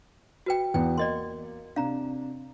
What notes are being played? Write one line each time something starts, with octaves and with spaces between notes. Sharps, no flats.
F#4 B4 G5
E2 B3 G5
A#3 D5 D#5 C6
C3 D4 F5 A#5